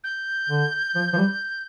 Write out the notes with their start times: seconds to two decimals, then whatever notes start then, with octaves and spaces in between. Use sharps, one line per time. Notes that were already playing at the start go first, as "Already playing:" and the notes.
0.04 G6
0.50 D3
0.95 F3
1.13 F3
1.18 G3